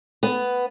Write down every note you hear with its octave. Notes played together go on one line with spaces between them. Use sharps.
B3